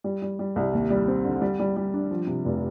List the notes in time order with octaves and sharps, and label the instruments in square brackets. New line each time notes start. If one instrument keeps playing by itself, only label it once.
[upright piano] G3
G3
G3
C2
D#2
G3
C4
D3
G3
G3
G3
D4
F3
C3
F1